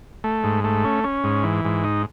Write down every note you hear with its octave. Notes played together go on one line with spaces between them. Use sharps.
A3
G#2
A3
C#4
C#4
G#2
E3
G#2
D#4